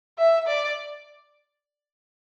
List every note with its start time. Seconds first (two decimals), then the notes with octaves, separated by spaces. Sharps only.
0.18 E5
0.47 D5